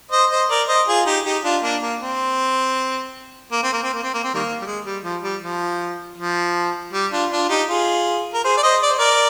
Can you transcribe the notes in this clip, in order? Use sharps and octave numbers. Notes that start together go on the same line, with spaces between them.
C5 D#5
C5 D#5
A#4 D5
C5 D#5
F4 G#4
D#4 G4
D#4 G4
D4 F4
A#3 D4
A#3
C4
A#3
C4
A#3
C4
A#3
C4
A#3
C4
D#3 G3 A#3
G3
G#3
G3
F3
G3
F3
F3
G3
D4 F4
D4 F4
D#4 G4
F4 G#4
A#4
G#4 C5
D5
C5 D#5
D5
C5
A#4 D5